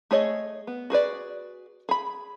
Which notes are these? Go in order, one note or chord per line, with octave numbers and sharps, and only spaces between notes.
A3 G#4 C#5 D#5
B3
F#4 G#4 B4 D5
G#4 B5